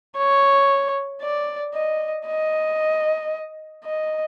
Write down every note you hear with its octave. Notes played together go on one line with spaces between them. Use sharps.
C#5
D5
D#5
D#5
D#5